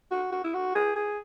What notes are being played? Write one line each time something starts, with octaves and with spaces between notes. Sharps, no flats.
F#4
F#4
E4
F#4
G#4
G#4